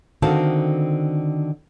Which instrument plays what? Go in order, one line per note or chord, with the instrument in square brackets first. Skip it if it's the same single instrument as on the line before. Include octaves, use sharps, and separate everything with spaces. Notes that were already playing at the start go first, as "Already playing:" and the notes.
[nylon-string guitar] D3 D#3 C4 F#4 F5 A5